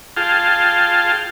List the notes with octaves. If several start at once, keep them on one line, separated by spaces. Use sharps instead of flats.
F4 G#4 F5 G5 A5